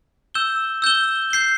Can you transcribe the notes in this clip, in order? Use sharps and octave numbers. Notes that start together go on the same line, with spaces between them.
E6 G6 E7 G7
E6 G6 E7 G7
G6 C7 G7